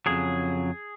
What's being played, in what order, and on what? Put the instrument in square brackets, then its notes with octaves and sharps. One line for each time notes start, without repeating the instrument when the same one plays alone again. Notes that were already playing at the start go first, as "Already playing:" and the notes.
[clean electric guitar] F2 C#3 F#3 G#4